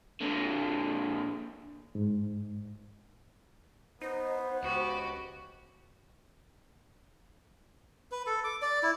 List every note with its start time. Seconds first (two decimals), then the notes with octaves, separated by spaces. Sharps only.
0.21 A#2 D3
1.95 G#2
4.01 B3 D#4 C5
4.63 C#2 F#4 G4
8.12 B4
8.27 A4
8.44 D6
8.62 D5
8.83 E4